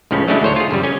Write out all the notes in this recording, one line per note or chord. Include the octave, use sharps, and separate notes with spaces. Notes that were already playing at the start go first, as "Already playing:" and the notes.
C#2 A2 C#3 F3 C#4
F#3 G#3 A3 C#4 D4 E4
D2 A2 C5 C#5
F4 G#4
G1 C#3 G3
C#4 G#5